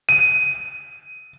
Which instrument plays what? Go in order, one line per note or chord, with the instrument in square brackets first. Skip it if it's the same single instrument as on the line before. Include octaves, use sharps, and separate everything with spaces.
[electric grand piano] D#7